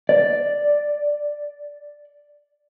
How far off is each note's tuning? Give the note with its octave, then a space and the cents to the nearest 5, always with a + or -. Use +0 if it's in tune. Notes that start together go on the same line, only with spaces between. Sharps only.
D5 +0